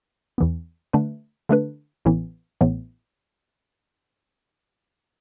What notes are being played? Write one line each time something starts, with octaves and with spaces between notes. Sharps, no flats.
E2 E3 B3
D3 A3 D4 B4
D3 A3 D4 B4
A1 A2 E3 B3
A1 A2 E3 B3